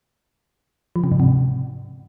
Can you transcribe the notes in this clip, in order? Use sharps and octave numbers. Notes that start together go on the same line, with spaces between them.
F3
C#3
G#2
C3